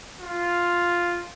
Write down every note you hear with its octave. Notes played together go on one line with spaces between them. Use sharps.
F4